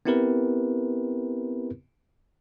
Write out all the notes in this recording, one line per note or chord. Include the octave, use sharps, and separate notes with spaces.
B3 C4 E4 G4 A#4 B4